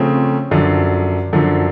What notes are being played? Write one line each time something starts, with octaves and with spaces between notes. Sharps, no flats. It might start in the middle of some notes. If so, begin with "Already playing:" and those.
Already playing: C#3 F3 A3 C4
F#2 D3 F3
F#2 D3 F3